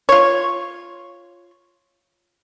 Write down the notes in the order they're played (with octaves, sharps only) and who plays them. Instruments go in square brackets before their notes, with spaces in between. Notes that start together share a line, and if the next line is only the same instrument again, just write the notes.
[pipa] F4 C#5